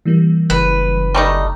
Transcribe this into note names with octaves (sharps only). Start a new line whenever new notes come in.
E3 G3 A#3
F#1 B4
G3 A3 D#4 A5